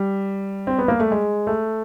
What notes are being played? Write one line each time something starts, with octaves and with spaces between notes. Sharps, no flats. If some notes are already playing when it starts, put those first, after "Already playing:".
Already playing: G3
C4
B3
A#3
A3
G#3
A3